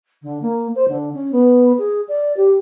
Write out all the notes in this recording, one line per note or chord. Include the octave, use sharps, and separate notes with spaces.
D3
A#3
C5
D3
C#4
B3
G#4
D5
G4